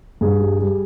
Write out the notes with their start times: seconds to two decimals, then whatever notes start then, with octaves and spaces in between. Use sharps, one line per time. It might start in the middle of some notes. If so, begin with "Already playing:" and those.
0.21 G2 G#4
0.40 G3
0.60 G3